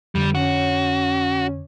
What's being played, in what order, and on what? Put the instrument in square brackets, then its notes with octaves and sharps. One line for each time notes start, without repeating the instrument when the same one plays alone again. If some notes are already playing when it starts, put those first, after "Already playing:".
[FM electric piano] F2 D3 [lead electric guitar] G3
[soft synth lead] C#4 [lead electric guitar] F#4